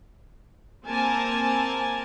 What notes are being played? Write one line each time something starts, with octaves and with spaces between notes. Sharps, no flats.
A#3 C4 A#4 G#5 A5